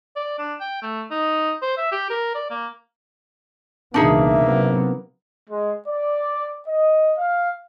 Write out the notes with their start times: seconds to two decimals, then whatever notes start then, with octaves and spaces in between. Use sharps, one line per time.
0.16 D5
0.38 D4
0.60 G5
0.82 A3
1.11 D#4
1.62 C5
1.77 E5
1.92 G4
2.10 A#4
2.35 D5
2.50 A#3
3.94 C#2 B2 E3 A#3 D4 D#4 G#4 E5
4.43 C3 F#3 B3
5.48 G#3
5.88 D5
6.68 D#5
7.18 F5